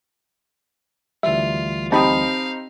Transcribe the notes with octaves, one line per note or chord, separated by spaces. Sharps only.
D2 E3 G3 F4 E5
C4 D#4 G4 F5 A5 B5 D#6